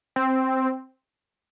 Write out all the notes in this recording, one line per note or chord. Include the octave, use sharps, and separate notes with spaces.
C4